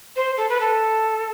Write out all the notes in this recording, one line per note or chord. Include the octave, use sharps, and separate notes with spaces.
C5
A4
B4
A4